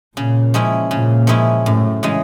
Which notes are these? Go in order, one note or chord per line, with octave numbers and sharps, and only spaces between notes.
A#2 C#3
F3 G#3 C#4 E4
A#2 C#3
F3 G#3 C#4 E4
F#2 A2
C#3 E3 G#3